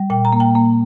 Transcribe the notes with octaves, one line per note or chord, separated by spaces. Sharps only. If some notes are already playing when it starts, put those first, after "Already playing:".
Already playing: G3
A#2 G5
A#5
A#3
G5
A#3